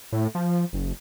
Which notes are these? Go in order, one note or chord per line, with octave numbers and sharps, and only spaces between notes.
A2
F3
F#1